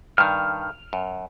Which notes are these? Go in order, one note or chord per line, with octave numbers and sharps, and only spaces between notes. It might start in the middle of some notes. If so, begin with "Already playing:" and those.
G2 D#3 F6
F#2